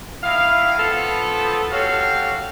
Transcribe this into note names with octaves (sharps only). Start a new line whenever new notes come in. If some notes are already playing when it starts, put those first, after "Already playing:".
D#3 E4 F5
F3 B3 A4
F#4 G4 A4 C#5 F5